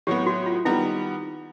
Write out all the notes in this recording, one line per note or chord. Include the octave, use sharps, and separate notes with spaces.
A2 F#3 B3 G4
F#4
F4
D#3 G3 B3 E4